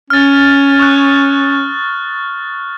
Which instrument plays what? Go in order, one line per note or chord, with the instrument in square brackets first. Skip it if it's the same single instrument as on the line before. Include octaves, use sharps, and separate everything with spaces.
[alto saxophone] C#4 [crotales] F6 A6
[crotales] C#6 D#6 F#6